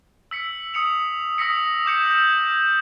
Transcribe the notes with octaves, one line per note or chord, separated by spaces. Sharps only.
E6 B6 C#7
D#6 C#7 F7
D#6 E6 A#6 B6 C#7
D6 G6 C#7
E6 G6